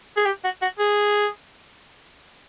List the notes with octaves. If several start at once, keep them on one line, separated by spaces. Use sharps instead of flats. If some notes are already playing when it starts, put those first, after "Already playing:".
G#4
G4
F#4
F#4
G#4